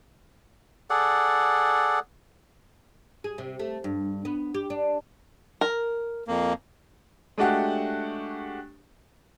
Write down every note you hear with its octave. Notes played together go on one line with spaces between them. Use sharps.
G#4 A4 D5 F#5
G#4
C3
A3
G2
B3
G4
D4
A#4
F2 A#3
G#3 A3 D4 F#4 G4 F#5